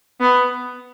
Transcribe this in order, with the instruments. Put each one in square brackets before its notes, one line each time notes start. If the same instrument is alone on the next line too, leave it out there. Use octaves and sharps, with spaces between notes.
[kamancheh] B3